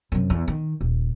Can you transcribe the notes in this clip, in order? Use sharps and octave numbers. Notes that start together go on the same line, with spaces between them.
F#2 C3
E2
D#3
D#1